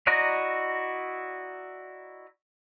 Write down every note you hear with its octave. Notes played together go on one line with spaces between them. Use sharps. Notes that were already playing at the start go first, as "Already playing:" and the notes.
E4 F#4 D5 D#5 A#5